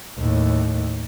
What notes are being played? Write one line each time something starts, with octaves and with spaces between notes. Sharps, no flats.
D#2 A2